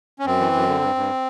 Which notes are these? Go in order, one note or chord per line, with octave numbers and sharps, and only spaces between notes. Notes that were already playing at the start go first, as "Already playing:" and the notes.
C#4
F#2 C4
E3
F#2
D3
G2
G2